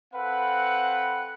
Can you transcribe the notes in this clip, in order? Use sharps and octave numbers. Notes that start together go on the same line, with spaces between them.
C4 A4 B4 F5 F#5